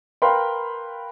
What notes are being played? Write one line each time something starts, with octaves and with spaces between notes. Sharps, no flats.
A#4 B4 F5 G5 B5 C6